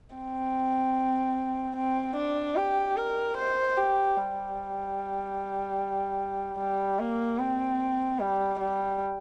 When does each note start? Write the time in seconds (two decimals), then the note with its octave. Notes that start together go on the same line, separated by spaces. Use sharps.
0.15 C4
1.76 C4
2.16 D4
2.56 G4
2.96 A#4
3.37 C5
3.77 G4
4.17 G3
6.58 G3
6.99 A#3
7.39 C4
8.19 G3
8.59 G3